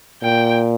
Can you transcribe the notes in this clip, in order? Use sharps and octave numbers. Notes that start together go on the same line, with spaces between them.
A#2 G5